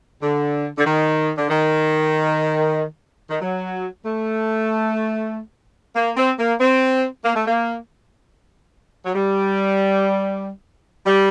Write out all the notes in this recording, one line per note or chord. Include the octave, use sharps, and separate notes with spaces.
D3
D3
D#3
D3
D#3
D#3
F#3
A3
A#3
C4
A#3
C4
A#3
A3
A#3
F#3
G3
G3